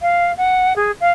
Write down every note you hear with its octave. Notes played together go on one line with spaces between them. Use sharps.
F5
F#5
G#4
F5